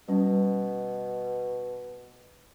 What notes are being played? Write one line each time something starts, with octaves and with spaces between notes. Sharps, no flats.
B2 G3 C#4